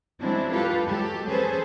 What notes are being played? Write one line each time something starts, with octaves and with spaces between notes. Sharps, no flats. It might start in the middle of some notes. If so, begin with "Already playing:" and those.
F#3 G#3 C4 D4 E4
F4 G4 A4 B4
F#3 G#3 G4 A4
C#4 G#4 A4 B4 C5